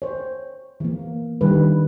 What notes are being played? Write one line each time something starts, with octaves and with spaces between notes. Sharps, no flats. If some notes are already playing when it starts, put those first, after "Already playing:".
C5 C#5
E3 A#3
D#3 G3 D4 B4